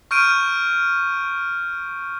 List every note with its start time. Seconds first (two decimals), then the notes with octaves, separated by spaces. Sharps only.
0.11 C#6 F6 G6 D7 D#7